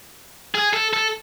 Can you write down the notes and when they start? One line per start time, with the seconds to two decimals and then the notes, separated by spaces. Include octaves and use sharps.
0.55 G#4
0.73 A4
0.93 A4